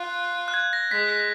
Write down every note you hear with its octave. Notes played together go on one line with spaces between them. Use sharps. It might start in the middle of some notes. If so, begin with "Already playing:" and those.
Already playing: F4 F#6
F#6
G#6
A#6
G#3 B6
B6